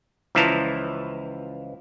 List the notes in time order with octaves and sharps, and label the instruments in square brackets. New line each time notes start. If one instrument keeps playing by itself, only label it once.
[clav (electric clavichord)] C#2 E3 F3 E4 A5 A#5